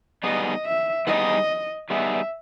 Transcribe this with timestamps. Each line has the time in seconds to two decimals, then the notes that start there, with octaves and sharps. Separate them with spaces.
0.24 G3 B3 D#4 G#4 D#5
0.66 E5
1.07 G3 B3 D#4 G#4 D#5
1.90 G3 B3 D#4 G#4 E5